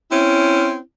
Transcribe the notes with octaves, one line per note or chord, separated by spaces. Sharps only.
C4 C#4 E4